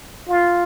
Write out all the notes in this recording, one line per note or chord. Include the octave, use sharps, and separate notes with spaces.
F4